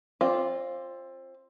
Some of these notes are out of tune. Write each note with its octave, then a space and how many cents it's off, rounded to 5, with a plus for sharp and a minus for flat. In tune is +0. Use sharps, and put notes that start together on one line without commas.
C4 +25 F4 +0 D5 -5